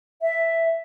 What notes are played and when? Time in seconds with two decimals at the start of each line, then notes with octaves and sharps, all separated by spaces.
0.22 E5